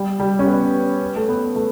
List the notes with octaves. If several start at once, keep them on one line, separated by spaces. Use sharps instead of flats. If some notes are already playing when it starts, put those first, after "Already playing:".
Already playing: G3
G3
C#4
B3
A3
B3
A3